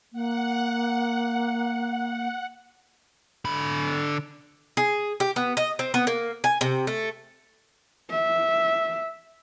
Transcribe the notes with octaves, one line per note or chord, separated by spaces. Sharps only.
A#3 F#5
D3 B5
G#4
G4
B3
D#5
C4
B3
A#3
G#5
C3
A3
E5